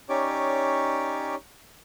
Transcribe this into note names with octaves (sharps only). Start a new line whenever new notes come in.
C#4 D#4 G4 C#5 D5 D6